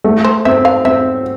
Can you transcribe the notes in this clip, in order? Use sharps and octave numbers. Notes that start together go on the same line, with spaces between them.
A3
C5
C4 E5
F5
C4 E5